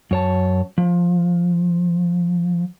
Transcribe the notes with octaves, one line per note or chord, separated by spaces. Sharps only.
F#2 C#5 A5
F3